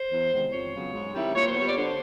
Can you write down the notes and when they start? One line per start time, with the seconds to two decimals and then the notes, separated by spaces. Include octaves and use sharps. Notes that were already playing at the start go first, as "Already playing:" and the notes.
Already playing: C5
0.11 E2
0.31 C3 D#3 G#3 B3
0.51 F2 C#5
0.72 C#3 F#3 B3
0.93 G#2
1.14 D#3 G3 C4 E4
1.34 A#2 C#5
1.45 C5
1.54 G3 B3 C#5
1.65 D5
1.75 D3 C5